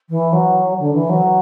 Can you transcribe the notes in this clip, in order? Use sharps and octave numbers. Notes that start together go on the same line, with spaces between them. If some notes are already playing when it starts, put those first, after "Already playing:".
E3
F#3
D3
E3
F#3